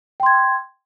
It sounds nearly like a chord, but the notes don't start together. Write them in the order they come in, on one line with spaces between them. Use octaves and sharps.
G5 C6 G#6